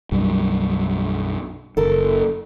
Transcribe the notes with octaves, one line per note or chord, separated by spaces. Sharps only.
B1 F#2 G3
F#1 A4 A#4